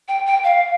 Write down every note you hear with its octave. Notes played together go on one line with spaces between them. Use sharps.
G5
G5
F5